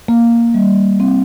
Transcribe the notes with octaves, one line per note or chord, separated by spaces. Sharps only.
A#3
G3
C4